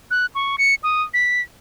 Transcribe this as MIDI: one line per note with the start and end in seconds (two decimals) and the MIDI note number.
0.11 0.26 90
0.35 0.56 85
0.58 0.75 97
0.83 1.03 87
1.14 1.41 95